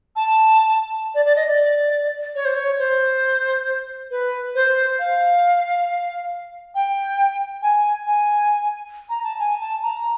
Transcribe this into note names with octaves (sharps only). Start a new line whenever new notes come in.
A5
D5
D5
D#5
D5
C#5
C5
C#5
C5
B4
C5
F5
G5
G#5
G#5
A#5
A5
G#5
A5
A#5